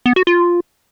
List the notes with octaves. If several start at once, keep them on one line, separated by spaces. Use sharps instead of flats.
B3
F#4
F4